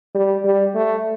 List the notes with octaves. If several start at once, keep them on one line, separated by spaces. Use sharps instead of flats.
G3
G3
A3